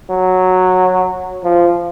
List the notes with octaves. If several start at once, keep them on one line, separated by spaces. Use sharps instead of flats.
F#3
F3